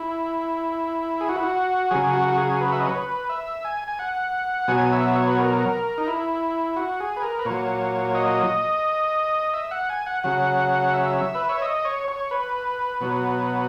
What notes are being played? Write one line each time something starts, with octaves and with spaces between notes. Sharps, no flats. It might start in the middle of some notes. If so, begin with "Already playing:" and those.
Already playing: E4
G#4
F#4
E4
F#4
C#3 F#3 G#4
F#4
F#4
G#4
B4
E5
D#5
C#5
B4
E5
G#5
G#5
F#5
B2 F#3 G#5
E5
C#5
B4
A#4
D#4
E4
F#4
G#4
B4
A#4
B4
A#2 F#3 C#5
D#5
E5
F#5
G#5
F#5
C#3 F#3 F#5
E5
B4
C#5
D#5
C#5
C#5
B4
B2 F#3